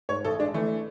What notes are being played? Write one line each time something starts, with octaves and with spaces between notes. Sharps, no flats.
G#2 C#5
A1 A4
G#3 D4
E3 A3